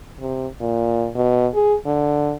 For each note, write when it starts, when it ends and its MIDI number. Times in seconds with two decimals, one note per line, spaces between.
0.20 0.47 48
0.60 1.08 46
1.15 1.47 47
1.54 1.75 68
1.86 2.34 50